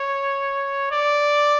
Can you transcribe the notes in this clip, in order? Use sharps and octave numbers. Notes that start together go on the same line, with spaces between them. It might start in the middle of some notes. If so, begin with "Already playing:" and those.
Already playing: C#5
D5